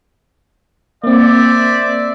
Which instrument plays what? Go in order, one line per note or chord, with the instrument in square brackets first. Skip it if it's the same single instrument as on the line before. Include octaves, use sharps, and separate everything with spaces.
[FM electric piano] A#3 C4 [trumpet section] C5 D5 E5